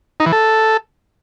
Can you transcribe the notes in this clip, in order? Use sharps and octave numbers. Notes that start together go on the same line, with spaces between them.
D#4
E3
A4